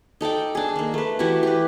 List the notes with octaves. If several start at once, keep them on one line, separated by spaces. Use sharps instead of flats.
D#4 A4 D5 G5
D4 G#4
D#3 A#3
A3 B4
E3 E4 F#4 G4
G4 B4